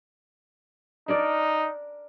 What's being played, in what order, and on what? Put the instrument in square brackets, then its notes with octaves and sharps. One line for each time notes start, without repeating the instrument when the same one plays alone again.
[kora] D4 A#4 D5 [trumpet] D#4